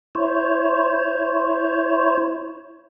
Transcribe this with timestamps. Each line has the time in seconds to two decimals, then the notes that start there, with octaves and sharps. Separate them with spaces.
0.15 E4 C5 C#5